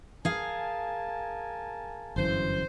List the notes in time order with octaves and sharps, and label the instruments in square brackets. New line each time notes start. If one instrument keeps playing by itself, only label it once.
[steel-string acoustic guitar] G#4 F5 [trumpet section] A#4 G#5 A5
[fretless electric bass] G1 F#2 E3 [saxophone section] C5